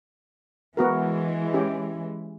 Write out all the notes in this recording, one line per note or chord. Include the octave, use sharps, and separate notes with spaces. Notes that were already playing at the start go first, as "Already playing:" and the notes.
E3 G#3 B3 F#4 A#4
C#4 G4